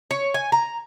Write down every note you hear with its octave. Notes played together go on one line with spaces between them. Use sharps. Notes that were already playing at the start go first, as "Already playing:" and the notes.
C#5
G#5
A#5